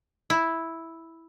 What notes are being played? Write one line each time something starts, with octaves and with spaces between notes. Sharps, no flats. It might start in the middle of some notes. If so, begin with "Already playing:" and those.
E4